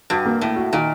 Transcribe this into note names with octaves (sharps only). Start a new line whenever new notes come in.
G2 F#4
A#3
A2 A#3
F#4
A#2 D#3